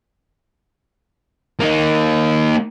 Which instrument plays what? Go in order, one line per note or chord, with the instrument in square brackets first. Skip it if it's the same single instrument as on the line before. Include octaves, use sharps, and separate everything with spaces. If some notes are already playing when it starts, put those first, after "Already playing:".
[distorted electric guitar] A#3 D#4